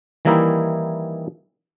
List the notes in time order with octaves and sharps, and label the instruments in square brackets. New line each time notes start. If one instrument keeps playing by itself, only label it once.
[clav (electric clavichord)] D#3 E3 G3 A#3 D#4 E4